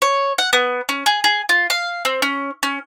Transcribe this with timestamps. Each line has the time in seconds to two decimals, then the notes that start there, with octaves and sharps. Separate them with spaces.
0.02 C#5
0.38 F#5
0.53 B3
0.89 C#4
1.06 G#4
1.24 G#4
1.49 F4
1.70 F5
2.05 C4
2.22 C#4
2.63 C#4